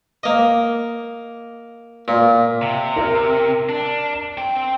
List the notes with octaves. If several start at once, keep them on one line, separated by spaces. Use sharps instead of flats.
A#3 D#5
A#2
C3
A#4
D4
C4 G5